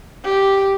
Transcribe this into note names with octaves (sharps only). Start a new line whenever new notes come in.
G4